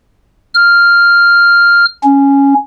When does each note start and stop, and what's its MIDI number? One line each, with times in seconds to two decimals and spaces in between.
0.54 1.85 89
2.04 2.54 61